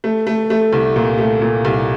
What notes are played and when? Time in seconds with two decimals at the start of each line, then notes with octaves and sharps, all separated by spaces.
0.04 A3
0.27 A3
0.50 A3
0.73 C2
0.96 A#2
1.18 A3
1.41 A#2
1.65 C2